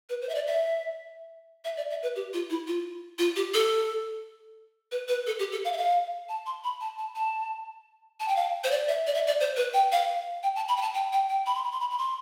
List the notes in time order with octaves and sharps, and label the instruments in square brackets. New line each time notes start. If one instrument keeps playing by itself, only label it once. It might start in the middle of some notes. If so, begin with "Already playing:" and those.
[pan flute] B4
C5
E5
D5
E5
E5
D5
E5
B4
G4
F4
E4
F4
F4
G4
A4
B4
B4
A4
G4
A4
F5
E5
F5
A5
C6
B5
A5
A5
A5
A5
G5
F5
C5
D5
E5
D5
E5
D5
C5
B4
G5
F5
G5
A5
B5
G5
A5
G5
G5
G5
B5
C6
B5
C6
B5
B5
C6